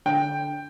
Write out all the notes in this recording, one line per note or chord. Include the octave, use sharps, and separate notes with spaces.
D3 G5